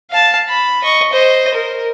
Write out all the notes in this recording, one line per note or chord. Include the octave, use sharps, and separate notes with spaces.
F5 A5
B5
D#5 C#6
C5 D#5
A#4